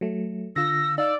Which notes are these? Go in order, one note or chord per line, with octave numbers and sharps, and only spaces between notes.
F#3 A3
D3 F4 E6 A#6
D#4 D5 F5 E6